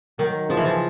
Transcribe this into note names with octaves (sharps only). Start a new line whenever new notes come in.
D#3 F#3
C#3 F3
E3
F3